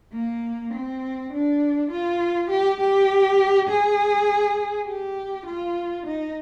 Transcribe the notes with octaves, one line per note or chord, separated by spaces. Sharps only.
A#3
C4
D4
F4
G4
G4
G#4
G4
F4
D#4